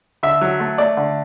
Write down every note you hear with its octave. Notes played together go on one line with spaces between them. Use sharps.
D3 E5
F#3
A3
A3 D5
D3